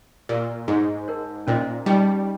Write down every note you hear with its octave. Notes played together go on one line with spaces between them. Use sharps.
A#2 G4 A#4 D#5 A#5 C#6
G#2 G#4 C#5 G#5 C#6
D#4 A#4 C#5
A#2 C#4 F4 C5 D#5
G3 D#4 G#4 D#5 G5 C#6